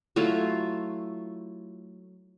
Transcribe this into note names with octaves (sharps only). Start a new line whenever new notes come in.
F#3 A3 E4 F4